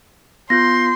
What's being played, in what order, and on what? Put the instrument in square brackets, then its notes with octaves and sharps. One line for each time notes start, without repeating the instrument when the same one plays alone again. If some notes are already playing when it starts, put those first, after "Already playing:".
[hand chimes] B3 F4 G6 [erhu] C6 [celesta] A#6